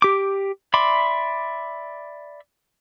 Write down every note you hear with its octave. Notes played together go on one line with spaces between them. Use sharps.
G4 D6
D5 E5 B5 C6 D6